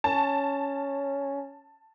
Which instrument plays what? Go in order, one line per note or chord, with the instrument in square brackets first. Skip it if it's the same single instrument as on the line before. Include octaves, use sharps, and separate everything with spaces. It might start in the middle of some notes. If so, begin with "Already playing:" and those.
[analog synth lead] C#4 [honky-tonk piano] A5